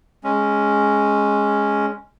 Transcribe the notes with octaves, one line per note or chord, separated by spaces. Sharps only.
G#3 C#4